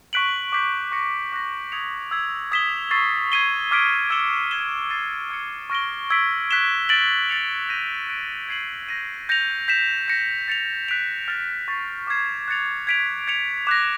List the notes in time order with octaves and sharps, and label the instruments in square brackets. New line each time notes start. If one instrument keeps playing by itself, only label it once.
[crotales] C#6 F#6 B6 D7 F#7
D6 G6 B6
C#6 F#6 A#6 C#7
D6 F#6 A#6
D#6 G#6 C#7 F7
E6 G#6 B6
D#6 G#6 B6 E7 G7
C#6 E6 A6 C7
G#6 C7 D#7 G7
D6 F6 G#6 B6 D7
E6 G#6 C#7 E7 G7
G#6 B6 E7 G7
A6 C7 D#7
E6 G#6 C#7
C#6 F6 A#6 D7 G7
E6 G#6 B6 D7
F#6 B6 E7 G7
A6 D7 F#7
A6 C#7 F7
G6 A#6 D#7
F#6 B6 D7
G#6 C7 D#7 F#7
G6 A#6 D#7
G6 A#6 C#7 F7
G6 B6 E7
G6 A#6 C#7
A6 C#7 F7
F#6 B6 D7 F7
F6 A6 C#7 F7
C#6 F#6 A6 C7
D6 F6 G#6 C7 E7
F#6 A6 C#7 F7
G#6 B6 D7 F7
G#6 C#7 F7
D6 F#6 A#6